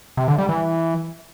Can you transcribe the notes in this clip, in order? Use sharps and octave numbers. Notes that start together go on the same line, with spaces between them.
C3
D3
G3
E3